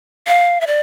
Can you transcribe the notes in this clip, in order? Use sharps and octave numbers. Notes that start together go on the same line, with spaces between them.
F5
E5
D5